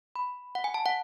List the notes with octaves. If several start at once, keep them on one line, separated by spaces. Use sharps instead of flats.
B5
F#5
G#5
A5
F#5